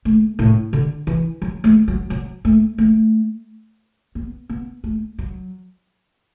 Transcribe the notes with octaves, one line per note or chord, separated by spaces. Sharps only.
A3
A2
D3
E3
F#3
A3
F#3
F#3
A3
A3
B3
B3
A3
F#3